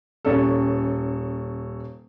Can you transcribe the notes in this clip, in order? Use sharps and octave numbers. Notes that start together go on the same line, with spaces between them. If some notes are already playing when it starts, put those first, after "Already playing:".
D#1 C#4 A4